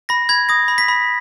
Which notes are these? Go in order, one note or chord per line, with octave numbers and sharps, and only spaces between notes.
B5 A#6
B5 G#6
D#6 A#6
B5
B6
B5